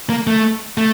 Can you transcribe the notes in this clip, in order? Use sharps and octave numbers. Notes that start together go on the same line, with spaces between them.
A#3
A3
A3